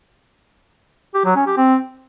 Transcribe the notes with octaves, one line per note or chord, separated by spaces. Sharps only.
G4
F#3
C#4
G4
C4